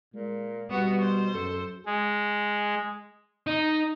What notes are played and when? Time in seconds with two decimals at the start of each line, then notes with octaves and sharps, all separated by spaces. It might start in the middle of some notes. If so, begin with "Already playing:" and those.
0.14 A#2 G#3
0.70 B2 G3 B3 F#4
1.01 C5
1.34 F#2 A4
1.86 G#3
3.47 D#4